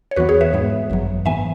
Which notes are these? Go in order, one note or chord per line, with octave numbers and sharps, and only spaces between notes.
C#5
E2 E3 B3 F#4 B4
G#4 C#5
B4 E5
G#2 G#3 B3
G#1 F#2 F#3
G#2 E3 B3 E5 G#5